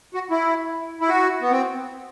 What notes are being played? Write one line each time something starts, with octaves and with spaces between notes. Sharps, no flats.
F#4
E4
E4
F#4
B3
C4